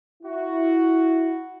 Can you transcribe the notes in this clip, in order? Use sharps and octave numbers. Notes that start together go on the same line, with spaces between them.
E4 F#4